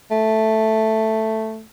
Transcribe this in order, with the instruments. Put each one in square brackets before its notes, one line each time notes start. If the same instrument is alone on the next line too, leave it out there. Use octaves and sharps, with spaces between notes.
[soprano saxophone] A3